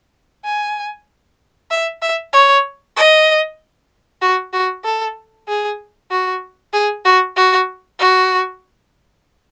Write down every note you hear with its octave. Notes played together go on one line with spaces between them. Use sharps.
G#5
E5
E5
C#5
D#5
F#4
F#4
A4
G#4
F#4
G#4
F#4
F#4
F#4